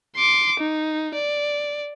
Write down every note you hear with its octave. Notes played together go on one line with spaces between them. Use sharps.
C6 D6
D#4
D5